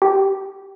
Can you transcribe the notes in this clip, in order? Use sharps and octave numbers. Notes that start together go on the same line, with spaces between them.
G4